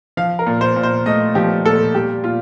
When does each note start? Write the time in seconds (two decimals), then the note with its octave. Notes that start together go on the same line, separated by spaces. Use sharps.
0.17 F3 F5
0.39 A#4
0.47 A#2
0.61 C5
0.76 A#2
0.83 C5
1.06 A3 D#5
1.35 F3 G4
1.65 A#2 A4
1.95 G3 G4
2.24 A#2 F4